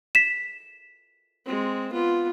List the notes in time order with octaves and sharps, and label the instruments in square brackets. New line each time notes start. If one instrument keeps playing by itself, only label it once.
[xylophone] B6 E7
[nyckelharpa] G#3 C4
B3 F4